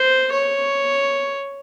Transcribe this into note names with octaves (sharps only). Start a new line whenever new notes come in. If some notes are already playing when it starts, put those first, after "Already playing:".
Already playing: C5
C#5